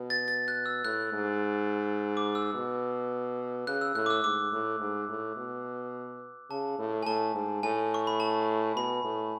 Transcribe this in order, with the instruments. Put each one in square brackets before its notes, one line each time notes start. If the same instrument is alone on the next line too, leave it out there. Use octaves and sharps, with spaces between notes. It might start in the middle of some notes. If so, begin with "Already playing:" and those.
Already playing: [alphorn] B2
[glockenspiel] A6
A6
F#6
E6
[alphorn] A2 [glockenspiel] F#6
[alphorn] G#2
[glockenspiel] D6
E6
[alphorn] B2
[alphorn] C#3 [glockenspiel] F#6
[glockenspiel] E6
[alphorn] A2 [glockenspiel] F#6
[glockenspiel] D6
E6
[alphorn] G#2 [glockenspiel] D6
[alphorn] A2
G#2
A2
B2
[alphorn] C#3 [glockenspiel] A5
[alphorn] A2
[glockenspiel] G#5
[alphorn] A2 [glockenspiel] A5
[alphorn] G#2
[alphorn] A2 [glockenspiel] G#5
[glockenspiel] C#6
B5
A5
[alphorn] B2 [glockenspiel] B5
[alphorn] A2